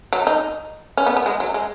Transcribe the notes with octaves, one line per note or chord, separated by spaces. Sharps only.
F#3
D#4
C#4
B3
B3
G#3
F#3
G#3